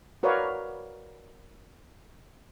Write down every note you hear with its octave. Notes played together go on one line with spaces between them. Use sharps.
F#4 A#4 B4 C#5 D5 F5